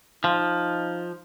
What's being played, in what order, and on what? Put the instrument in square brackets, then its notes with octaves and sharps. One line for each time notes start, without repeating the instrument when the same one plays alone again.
[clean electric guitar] F3 [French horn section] D#4